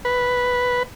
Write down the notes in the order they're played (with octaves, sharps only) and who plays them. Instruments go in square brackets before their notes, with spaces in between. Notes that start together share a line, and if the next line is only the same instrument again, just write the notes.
[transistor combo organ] B4